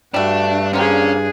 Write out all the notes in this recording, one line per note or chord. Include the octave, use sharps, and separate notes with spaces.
G2 G3 A3 D4 F#4
D3 F3 A#3 C#4 D4 G#4